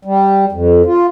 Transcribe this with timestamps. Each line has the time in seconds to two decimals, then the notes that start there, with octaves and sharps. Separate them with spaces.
0.05 G3
0.52 F2
0.86 F4